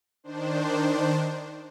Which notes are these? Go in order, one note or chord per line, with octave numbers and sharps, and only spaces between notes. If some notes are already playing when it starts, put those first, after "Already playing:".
D#3 D4 C5